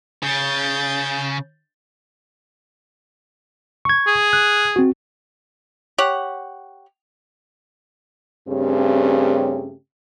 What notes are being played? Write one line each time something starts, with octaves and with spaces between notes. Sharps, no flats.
C#3 G6 A6
C#6 G#6
G#4
F#6
C4 F#4
G4 C#5 F#5
G2 C#3 A3 C4 C#4 G4